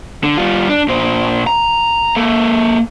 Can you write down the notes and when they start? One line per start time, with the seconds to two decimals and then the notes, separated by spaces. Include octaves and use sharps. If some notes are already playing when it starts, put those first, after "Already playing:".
0.24 D3
0.37 G3 F4
0.69 D4
0.88 A#2 C5
1.47 A#5
2.16 A#3 A4